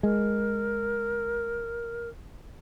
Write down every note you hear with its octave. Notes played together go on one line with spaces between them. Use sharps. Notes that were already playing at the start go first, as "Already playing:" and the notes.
G#3 A#4